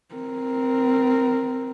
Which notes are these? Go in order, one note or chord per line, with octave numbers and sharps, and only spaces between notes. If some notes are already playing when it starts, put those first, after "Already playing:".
C4 A#4